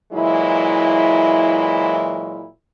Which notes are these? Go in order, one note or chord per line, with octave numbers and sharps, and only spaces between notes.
A#2 E3 F#3 G#3 E4